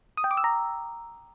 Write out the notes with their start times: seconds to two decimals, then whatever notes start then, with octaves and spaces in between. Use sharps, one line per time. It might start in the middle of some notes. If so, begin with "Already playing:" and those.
0.17 D#6
0.24 G5
0.31 D6
0.37 E6
0.44 A#5